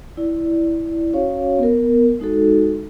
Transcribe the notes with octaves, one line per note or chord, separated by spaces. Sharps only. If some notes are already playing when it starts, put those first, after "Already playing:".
E4 D5
C#4 F#4 C#5 F5
B3 A#4
G#3 D#4 F#4 A4